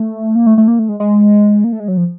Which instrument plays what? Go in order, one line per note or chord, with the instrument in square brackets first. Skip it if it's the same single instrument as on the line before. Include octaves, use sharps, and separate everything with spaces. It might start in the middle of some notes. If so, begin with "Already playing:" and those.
Already playing: [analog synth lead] A3
A#3
A3
A3
A#3
A3
G#3
G#3
A#3
A3
G#3
F#3
F3